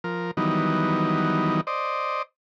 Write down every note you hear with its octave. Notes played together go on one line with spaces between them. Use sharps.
F3 A#4
D#3 E3 F#3 G3 B3 D#4
C5 D5 D#5